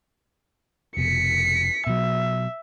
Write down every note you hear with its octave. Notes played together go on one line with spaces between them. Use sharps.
F1 B2 B6 C#7
B2 F#3 E5